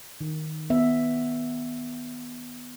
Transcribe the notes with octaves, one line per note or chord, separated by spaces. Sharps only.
D#3
B3 E5